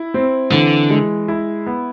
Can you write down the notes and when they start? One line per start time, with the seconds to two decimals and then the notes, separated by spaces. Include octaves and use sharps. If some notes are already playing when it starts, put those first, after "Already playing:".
Already playing: E4
0.14 C4
0.52 D3 E3
0.90 G#3
1.28 E4
1.67 B3